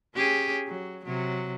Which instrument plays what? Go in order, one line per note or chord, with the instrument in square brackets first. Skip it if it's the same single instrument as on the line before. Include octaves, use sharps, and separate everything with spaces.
[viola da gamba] C#4 G4 G#4
F#3
C3 F#3